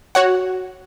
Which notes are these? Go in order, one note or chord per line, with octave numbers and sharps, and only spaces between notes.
F#4 C#5 F#5